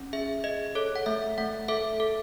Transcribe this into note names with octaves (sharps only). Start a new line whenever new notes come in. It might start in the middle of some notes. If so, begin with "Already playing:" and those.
Already playing: C#4
G#4 E5
G#4 D#5
A4 C#5
F#5
A3 E5
A3 F#5
A4 E5
A4